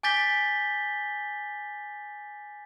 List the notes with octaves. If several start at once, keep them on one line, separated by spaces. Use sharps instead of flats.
G#5 D6 G6 A6 B6 G7